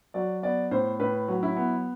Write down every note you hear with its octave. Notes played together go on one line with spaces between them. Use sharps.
F#3 D5
B3 D5
A2 C5
A2 B4
F#3
E4
B3